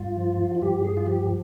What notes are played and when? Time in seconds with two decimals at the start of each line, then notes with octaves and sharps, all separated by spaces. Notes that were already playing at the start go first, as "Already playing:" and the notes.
Already playing: G2 F4
0.17 F3
0.55 F4
0.62 G2 G4
0.84 G#4
0.97 F4
1.06 F3 G4